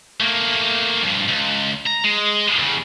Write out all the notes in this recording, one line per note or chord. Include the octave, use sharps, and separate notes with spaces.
A3 A#3
G2 F3
C#2
A#5
G#3
E2 C#3